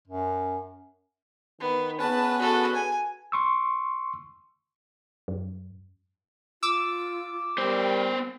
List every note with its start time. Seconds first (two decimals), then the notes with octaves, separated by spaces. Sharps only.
0.08 F#2
1.60 D#3 B3
2.00 B3 C#4 G#4 B4 A5
2.40 F#4 A4
2.75 G#5
3.32 C6 C#6 E6
5.28 F#2
6.63 F4 D6 E6
7.58 G3 B3 A#4 C5